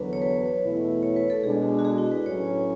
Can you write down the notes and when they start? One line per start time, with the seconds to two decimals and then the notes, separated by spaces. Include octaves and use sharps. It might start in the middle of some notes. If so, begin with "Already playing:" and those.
Already playing: E2 D3 F#3 B3 D4 B4
0.13 C#5
0.22 B4
0.63 E2 B2 A3 E4
1.03 C#5
1.16 B4
1.30 A4
1.43 B2 G#3 D4 G#4
1.79 F#4
1.85 G#4
1.98 E4
2.11 B4
2.25 A2 F#3 C#4 C#5